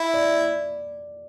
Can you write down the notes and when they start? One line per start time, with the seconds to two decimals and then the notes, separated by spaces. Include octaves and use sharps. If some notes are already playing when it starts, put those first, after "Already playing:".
Already playing: E4
0.14 D5